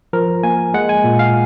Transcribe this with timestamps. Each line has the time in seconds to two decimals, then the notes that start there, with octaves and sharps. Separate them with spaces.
0.13 F3 A#4
0.43 A#3 G#5
0.74 G#3 F#5
0.89 G#5
1.04 A#2
1.19 F5